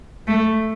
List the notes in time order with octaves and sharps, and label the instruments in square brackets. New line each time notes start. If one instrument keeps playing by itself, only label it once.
[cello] A3